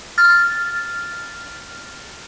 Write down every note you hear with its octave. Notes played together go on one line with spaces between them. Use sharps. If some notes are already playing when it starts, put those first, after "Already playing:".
F6 A6